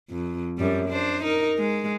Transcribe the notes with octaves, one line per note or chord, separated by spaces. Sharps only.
F2
F#2 G3
D4 C5
D#4 A#4
G#3